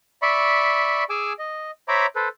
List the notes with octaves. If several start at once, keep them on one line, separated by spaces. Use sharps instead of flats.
D5 E5 B5 C#6
G#4 G#5 D6 E6
D#5
C5 C#5 E5 A#5 B5 D6
A4 B4 C5